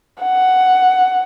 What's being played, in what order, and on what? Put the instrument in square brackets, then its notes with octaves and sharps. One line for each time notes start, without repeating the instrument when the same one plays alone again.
[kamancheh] F#5